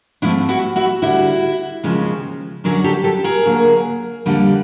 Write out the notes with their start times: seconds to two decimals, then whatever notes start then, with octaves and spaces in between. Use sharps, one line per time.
0.22 G#2 F3 A3 C4 D4 E4
0.49 E4 F#4
0.76 E4 F#4
1.02 D2 D3 G3 E4 F#4
1.83 D#2 C#3 F3 G#3 C4
2.64 F#2 D3 F#3 G#4 A#4
2.84 G4 A4
3.04 G4 A4
3.24 G#4 A#4
3.45 D2 D3 F#3 A#3
4.26 F2 D3 G3 A#3